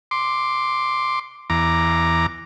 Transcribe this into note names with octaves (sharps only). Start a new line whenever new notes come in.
C6 D6
E2 A#5 D6